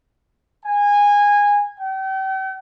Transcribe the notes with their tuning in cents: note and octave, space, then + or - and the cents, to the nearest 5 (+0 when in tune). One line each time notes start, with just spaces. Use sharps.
G#5 -20
G5 -40